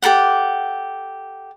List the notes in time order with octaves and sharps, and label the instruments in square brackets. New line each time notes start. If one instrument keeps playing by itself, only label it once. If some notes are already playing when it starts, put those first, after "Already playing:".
[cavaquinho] G4 A4 A#4 F#5